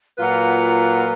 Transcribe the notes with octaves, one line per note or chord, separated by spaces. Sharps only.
A#2 F#3 A#3 F4 B4 F#5 A#5